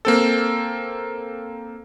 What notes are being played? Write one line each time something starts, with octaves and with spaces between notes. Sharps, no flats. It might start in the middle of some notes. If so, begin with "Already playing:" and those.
A#3 C4 A4